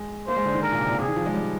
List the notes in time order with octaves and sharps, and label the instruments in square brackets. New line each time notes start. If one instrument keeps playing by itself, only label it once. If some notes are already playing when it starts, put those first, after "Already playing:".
Already playing: [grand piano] G#3
[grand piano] A#3 [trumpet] C5
[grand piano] G#3
D3
D#3
[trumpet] A#4
[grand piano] A#2
C3
A#2
[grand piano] C3 [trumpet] G#4
[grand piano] D#3
F3
G#3
G3